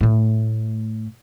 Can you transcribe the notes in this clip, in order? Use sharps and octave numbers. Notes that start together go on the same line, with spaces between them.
A2 A3